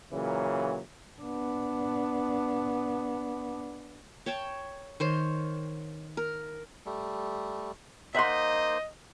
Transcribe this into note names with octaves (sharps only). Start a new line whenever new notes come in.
A#2 C#3 E3 F#3
B3 D4
C#5 G5 A5
D#3 C5 C#5
A#4
G3 A3
A#3 D#4 C5 D#5 E5 F#5 C6